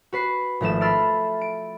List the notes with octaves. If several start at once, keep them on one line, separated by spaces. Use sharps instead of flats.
F#4 B4 C7
G#1 F3 A3 E7
B5 C6 E6 F6 A6 D7
D7